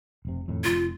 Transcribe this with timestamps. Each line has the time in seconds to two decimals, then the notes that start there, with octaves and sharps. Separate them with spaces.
0.25 F1 C3
0.48 F2 A2 D#3
0.64 F1 F4